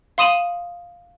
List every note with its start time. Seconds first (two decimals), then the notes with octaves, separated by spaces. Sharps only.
0.18 F5 C6 D#6 D#7 E7 F#7